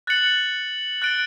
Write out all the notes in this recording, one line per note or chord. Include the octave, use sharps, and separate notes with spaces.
F#6 A6 C#7 F#7
F#6 A6 D7 G7